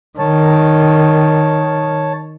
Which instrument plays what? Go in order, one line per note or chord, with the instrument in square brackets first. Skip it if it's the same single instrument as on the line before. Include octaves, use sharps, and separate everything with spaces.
[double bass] D#3 [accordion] C#5 A5